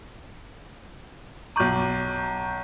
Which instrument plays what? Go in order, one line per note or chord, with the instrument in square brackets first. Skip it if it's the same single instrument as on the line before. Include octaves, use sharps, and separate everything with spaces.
[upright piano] B1 D6 [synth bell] A#5 C#6 G6